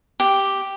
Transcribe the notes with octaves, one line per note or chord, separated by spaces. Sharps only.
G4